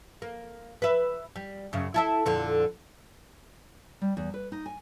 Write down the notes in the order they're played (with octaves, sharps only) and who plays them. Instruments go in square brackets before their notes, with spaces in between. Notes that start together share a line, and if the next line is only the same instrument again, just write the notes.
[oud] A#3
B4 E5
G3
F#2 C#3
E4 A4 E5
F2 A#2 D3
[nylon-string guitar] G3
E2
B4
D#4
G#5